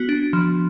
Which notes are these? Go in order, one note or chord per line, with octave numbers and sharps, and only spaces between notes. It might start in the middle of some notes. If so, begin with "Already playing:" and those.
Already playing: B3 F#4
D4
F3